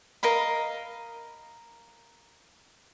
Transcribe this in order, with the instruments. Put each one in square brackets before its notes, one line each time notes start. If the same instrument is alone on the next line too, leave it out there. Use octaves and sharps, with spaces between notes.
[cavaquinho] A#4 D#5 F5 B5